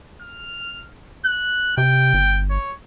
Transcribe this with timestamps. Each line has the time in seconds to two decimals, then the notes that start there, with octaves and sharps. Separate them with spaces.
0.22 F6
1.25 F#6
1.78 C3 G5
2.14 G1
2.50 C#5